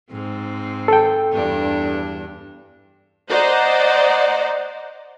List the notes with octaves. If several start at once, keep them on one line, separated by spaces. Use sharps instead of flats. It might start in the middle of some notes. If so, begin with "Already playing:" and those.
G#2 C4
A4 G5
E2 G2 D4
C5 D5 D#5 F#5 A#5